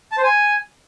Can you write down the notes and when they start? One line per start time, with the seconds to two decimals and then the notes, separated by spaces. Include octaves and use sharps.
0.12 A5
0.18 C5
0.23 G#5